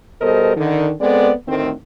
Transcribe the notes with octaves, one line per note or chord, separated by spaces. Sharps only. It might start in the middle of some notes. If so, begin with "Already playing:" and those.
B2 G3 A4 A#4 C5 D#5
D3 D#3
G#3 B3 C4 A4 D5
D2 A2 D#3 C4